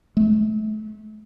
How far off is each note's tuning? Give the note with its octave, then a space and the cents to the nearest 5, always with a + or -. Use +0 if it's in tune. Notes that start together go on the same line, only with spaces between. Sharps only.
A3 -35